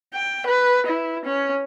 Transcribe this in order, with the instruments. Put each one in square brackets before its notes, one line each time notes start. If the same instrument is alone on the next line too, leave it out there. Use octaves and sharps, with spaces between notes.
[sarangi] G5
B4
E4
C#4